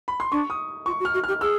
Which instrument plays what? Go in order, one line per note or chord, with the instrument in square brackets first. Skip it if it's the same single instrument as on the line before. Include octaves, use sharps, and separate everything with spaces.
[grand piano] B5
C6
[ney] D4 [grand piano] C#6
[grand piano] D#6
[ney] F4 [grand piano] C#6
[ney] F#4
[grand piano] F6
[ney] F#4
[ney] G4 [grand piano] F6
[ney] G#4 [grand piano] E6